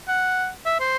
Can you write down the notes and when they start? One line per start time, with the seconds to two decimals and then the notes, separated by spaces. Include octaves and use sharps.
0.08 F#5
0.65 E5
0.80 C5